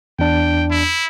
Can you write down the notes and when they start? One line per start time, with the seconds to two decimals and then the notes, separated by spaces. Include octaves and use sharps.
0.19 E2 D4 G5
0.71 E4